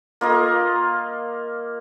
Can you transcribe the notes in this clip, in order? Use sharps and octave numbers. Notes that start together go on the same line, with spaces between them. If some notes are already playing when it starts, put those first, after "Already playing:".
A#3 F4 D#5